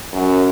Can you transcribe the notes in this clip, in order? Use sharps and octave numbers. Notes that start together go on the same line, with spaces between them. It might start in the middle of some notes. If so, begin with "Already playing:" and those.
F#2